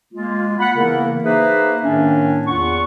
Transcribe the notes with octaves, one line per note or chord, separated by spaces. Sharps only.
G#3 A#3 F4
F#5 B5
C#3 E3 A#3 B3 E4 A#4
A#3 D#4 G#4 B4 C5 E5
A2 D#3 A#3 C#4 D4
E2 F4 F#5 C#6